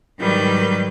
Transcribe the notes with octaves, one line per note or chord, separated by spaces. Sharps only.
G#2 D#3 F#3 G3 B4 G6